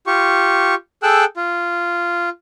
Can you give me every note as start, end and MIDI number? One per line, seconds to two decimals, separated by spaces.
0.07 0.75 65
0.07 0.75 67
0.07 0.75 85
1.03 1.25 68
1.03 1.25 69
1.03 1.25 79
1.03 1.25 88
1.03 1.25 90
1.37 2.29 65